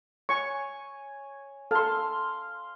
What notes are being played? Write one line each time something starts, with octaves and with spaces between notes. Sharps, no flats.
C#5 G#5 C#6
A4 F5 C6